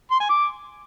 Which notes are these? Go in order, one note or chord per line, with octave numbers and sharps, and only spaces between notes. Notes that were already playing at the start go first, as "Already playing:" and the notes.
C6
G#5
D6